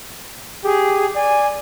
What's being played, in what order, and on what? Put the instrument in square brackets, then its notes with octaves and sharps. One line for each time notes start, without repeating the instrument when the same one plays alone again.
[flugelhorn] G4 [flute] G#4
[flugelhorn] D5 [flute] G#5